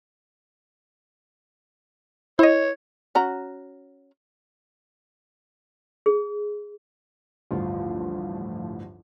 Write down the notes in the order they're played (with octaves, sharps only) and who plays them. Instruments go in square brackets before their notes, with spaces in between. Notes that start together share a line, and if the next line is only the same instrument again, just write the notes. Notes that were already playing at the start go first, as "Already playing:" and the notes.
[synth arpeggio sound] E4 D#5 [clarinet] C#5
[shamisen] C#4 F#4 A#5
[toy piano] G#4
[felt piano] A1 D2 G2 [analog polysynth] F3